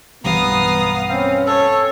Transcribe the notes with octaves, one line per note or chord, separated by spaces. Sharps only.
B1 G2 E3 B3 F5 A#5 D#6
C4 C#4 F5
A4 C#5